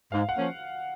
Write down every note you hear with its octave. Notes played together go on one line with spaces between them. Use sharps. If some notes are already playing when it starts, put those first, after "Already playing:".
G#2 F5
F#5
F3 A#3 C#4